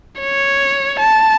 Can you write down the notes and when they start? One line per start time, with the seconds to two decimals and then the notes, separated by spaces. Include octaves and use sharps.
0.21 C#5
0.99 A5